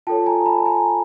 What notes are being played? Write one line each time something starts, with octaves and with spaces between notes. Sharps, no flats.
F4 A4 C#5 G5 A5
G#5 A#5
A5 B5
G#5 A#5